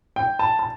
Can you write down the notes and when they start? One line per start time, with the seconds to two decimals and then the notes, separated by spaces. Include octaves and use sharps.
0.16 G5
0.39 A5
0.59 A5